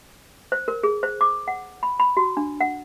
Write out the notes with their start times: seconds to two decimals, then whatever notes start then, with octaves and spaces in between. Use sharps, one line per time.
0.52 C5
0.68 A#4
0.83 G#4
1.03 C5
1.21 D6
1.48 F#5
1.83 B5
2.00 B5
2.17 F#4
2.37 D4
2.61 F#5